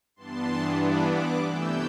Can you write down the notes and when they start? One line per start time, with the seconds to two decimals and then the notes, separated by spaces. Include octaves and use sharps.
0.16 G2 E3 B3 D4 A5 C6
0.80 B5 D6
1.13 D6 F#6
1.44 C3 E3 A3 E4 E6 G6